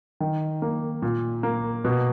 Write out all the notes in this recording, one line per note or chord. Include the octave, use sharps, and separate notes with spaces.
D#3
A#3
A#2
A#3
B2